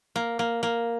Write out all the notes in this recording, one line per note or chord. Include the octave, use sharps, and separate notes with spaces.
A#3
A#3
A#3